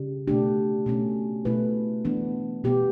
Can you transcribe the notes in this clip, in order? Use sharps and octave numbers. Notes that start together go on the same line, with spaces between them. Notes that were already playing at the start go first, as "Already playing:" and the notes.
Already playing: C#3 G3
B2 A3 D4 G4
B2 A3 C#4
B2 A3 E4 B4
E3 B3 D4
B2 G3 B3 G4